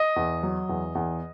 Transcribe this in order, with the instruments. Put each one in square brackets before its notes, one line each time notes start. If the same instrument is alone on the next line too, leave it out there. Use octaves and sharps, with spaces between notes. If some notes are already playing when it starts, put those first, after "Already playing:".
Already playing: [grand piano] D#5
E2
F#3
E2
E2